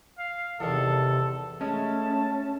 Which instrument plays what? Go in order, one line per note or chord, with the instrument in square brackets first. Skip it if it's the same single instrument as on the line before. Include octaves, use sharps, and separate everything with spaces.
[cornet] F5
[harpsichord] E2 D#3 [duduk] C3 [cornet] A4
[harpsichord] G#3 [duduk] A3 [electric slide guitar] C#4 [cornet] A5